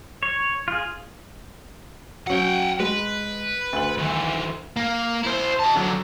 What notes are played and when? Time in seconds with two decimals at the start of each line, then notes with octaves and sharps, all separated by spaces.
0.23 C#5
0.68 F4 G#4
2.27 F#3 C#4 F#5 G5
2.80 G#3 B4
3.73 D2 F#7
3.98 D#3 E3
4.77 A#3
5.24 E4 C5
5.60 D#5 A5
5.77 D3 F#3